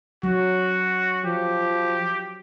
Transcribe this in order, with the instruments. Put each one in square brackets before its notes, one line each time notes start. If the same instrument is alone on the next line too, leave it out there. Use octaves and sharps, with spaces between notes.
[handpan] F#3 [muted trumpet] F#4
[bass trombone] F3 [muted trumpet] G4